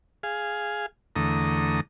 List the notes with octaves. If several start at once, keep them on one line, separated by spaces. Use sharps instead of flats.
G#4 F5
E2 D3 A3 A#5 D#6